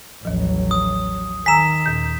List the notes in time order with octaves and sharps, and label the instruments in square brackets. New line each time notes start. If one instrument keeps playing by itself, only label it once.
[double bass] A1 F#3 [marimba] D#2 F3
[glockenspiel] D#6
[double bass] D#3 [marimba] G#5 A#5 E6 [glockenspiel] B6 E7
[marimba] D#2 A#2 G6